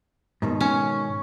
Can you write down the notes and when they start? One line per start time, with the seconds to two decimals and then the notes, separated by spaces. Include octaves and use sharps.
0.42 G#2 B2 D#3
0.60 C#4